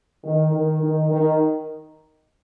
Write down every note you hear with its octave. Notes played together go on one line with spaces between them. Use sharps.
D#3
D#3
D#3
D#3